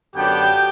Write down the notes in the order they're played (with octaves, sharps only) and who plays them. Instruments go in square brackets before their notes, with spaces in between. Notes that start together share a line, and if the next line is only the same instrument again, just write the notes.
[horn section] F#2 D3 F#3 B3 D4 G4 G5